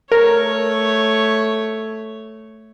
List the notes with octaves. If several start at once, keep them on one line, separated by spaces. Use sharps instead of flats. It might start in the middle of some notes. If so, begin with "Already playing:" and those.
A3 A#4 C#5